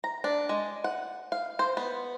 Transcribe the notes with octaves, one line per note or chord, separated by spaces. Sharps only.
A#5
D4
G#3
F#5
F5
C5
B3